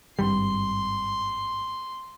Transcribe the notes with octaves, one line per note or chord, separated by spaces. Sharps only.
G#1 G2 G3 C6